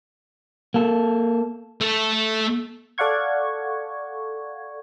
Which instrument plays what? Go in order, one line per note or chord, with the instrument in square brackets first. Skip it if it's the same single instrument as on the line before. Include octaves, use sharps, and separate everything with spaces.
[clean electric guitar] A#3 A4
[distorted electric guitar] A3 A4
[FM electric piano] A4 D5 F5 F#5 C#6 G#6